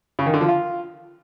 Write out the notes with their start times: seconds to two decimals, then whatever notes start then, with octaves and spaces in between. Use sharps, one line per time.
0.19 C#3
0.26 D#3
0.34 D3
0.41 F3
0.48 F4